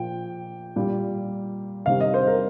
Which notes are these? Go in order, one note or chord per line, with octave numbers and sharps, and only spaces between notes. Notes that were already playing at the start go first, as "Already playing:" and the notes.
Already playing: A#2 F3 G5
A#2 G3
C3 D#3 G3 F5
D#5
C5
A#4